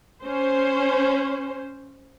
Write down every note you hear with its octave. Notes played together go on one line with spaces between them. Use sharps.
C#4 C5